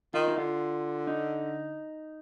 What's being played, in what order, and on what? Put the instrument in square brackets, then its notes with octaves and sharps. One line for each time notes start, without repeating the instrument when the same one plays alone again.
[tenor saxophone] D#3 [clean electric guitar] F4
[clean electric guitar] D#4
[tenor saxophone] D3 [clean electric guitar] F4
[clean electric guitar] D#4